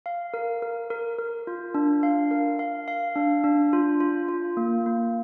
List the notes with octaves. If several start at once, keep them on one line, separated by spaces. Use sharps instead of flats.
F5
A#4
A#4
A#4
A#4
F4
D4
F5
A#4
F5
F5
D4
D4
F4
F4
F4
A#3
A#3